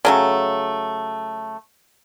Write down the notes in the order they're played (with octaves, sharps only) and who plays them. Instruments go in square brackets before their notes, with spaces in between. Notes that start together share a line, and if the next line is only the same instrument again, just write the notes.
[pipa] C#3 F#3 A3